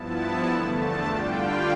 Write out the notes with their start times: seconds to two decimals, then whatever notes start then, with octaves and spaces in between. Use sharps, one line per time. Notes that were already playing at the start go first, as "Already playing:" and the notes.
Already playing: G2 F3 B3 E4 A5
0.17 A5
0.48 E2 D3 A3
0.77 A5
1.06 D3 G3 D4 F4 G5
1.37 F5